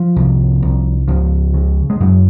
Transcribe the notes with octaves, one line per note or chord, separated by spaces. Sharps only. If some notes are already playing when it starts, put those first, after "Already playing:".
Already playing: F3
C2
C2
C#2 F3
C#3
G#3
F#2 C#3 F#3